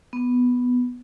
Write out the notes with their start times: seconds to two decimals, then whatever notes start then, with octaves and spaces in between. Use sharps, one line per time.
0.13 B3